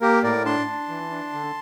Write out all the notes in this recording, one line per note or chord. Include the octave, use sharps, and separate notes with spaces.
A#3 G4 A#4
A2 A#4 D5
D4 A5 C6
D4
E3
D4
D3